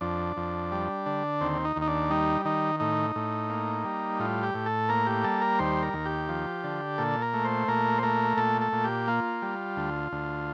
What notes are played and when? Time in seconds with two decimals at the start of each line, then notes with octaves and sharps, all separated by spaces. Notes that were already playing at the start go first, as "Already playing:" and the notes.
0.01 F2 D4
0.37 F2
0.72 G3
1.06 D3
1.41 D#2 C4
1.65 D#4
1.76 D#2
1.82 D#4
1.88 D4
2.10 G3 D#4
2.45 D#3 D#4
2.80 A2 D#4
3.16 A2
3.50 A#3
3.85 G3
4.19 A2 F4
4.43 G4
4.55 A2
4.66 A4
4.89 A#3 A#4
5.07 G4
5.24 G3 A4
5.41 A#4
5.59 D#2 C5
5.82 A#4
5.93 D#2
6.05 G4
6.29 F3
6.64 D3
6.98 A#2 A4
7.22 A#4
7.34 A3
7.44 C5
7.68 A#2 A#4
7.98 C5
8.03 A3 A#4
8.37 A#2 A4
8.61 A4
8.73 A#2
8.84 G4
9.07 A#3 F4
9.42 G3
9.77 D2
10.12 D2